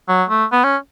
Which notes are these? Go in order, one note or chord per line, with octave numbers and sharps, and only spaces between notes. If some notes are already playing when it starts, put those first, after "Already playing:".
F#3
A3
B3
C#4